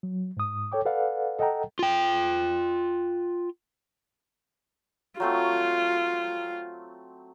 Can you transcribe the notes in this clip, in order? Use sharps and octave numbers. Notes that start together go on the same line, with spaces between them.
F#3
G#2 D#6
A4 C#5 G5 D6
A4 B4 D5 F5 F#5
A4 D#5 F#5 G5 A#5
F4 G5
F#3 A3 C4 F4